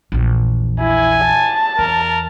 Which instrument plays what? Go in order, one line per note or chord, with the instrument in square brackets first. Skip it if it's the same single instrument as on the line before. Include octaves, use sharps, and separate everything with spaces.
[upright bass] A#1 E2
[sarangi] E4 [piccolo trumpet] G#5
[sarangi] A5
[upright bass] E2 [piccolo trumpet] A#4